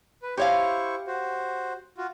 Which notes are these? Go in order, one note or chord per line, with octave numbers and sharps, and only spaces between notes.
B4
E4 G4 C5 C#5 F5 C#6
F#4 C5
F4 F#4